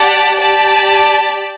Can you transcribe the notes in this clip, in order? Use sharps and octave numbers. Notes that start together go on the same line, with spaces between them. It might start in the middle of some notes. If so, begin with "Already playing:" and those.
Already playing: G4 D5 F#5 A5
G4 D5 A5